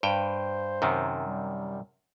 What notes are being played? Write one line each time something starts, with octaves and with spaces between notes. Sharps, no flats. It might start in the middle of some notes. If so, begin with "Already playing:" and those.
G2 C5 G5
F#2 C3 D#3
G3